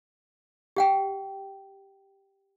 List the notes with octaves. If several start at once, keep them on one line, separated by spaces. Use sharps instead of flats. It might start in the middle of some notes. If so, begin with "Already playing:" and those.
G4 F#5 G5